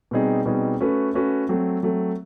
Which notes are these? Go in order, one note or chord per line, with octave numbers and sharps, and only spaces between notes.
B2 G3 C4 D#4 G#4
B2 G3 C4 D#4 G#4
A3 C#4 F#4 B4
A3 C#4 F#4 B4
F#3 A3 C4
F#3 A3 C4